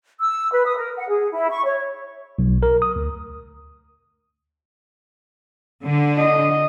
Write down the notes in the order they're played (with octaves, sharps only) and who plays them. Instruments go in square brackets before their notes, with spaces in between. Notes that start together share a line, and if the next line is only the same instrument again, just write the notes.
[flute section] E6
B4
D#6
A#4
F#5
G#4
E4
C#6
C#5
[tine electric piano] B1
A#4
D#6
D2
[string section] D3
[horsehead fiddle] D#5